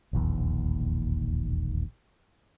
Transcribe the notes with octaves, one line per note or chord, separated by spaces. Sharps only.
E1 A#1 D#2